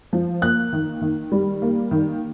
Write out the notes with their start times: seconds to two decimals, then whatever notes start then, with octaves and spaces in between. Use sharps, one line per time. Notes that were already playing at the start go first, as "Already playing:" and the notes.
0.13 F3
0.42 A#3 F#6
0.73 D#3
1.01 D#3
1.32 G3
1.62 A#3
1.91 D#3